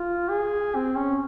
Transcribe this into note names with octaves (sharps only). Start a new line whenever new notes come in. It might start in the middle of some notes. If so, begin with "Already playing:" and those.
Already playing: F4
G#4
C4
C#4